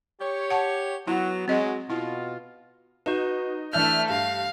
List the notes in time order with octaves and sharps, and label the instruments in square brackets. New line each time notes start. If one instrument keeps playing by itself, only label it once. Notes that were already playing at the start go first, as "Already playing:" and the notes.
[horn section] G4 C#5
[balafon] F#5 A5
[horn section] F#3 B3 [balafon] E4
[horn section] F#3 G#3 [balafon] C4 D#5
[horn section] B2 F4 [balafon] E4
[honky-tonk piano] D#4 [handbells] F#4 B4
[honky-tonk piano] E3 D4 E5 [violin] A3 F6 [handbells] G6
[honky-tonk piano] G2 [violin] F5